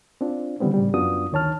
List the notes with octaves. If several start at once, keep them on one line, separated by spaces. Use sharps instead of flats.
C4 D4 F4
D3 E3 G3 B3 C4
A2 C#3 G3
F#2 B3 D4 F4 F#4 D#6
D2 D#3 C#5 A5 F6